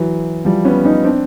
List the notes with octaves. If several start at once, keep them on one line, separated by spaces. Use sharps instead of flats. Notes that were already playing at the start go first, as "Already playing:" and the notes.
Already playing: E3 F#3
F3 G3
B3 C#4
C#4 D#4
C4 D4